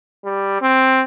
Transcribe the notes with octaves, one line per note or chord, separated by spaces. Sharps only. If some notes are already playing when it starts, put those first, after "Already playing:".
G3
C4